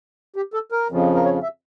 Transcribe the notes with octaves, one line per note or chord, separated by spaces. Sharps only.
G4
A4
A#4
F2 C#3 F3
A#4
C#5
E5